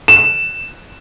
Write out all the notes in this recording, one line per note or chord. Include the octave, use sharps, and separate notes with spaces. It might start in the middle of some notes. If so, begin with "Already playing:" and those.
E7